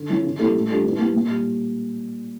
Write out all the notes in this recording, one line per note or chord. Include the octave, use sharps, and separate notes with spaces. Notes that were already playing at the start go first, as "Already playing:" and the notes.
Already playing: D3
F3 C#4 E4
C#3
G3 A#3 E4 A4
A2
G3 D4 F4 A4
E3
A#3 E4 G4
A#2
G3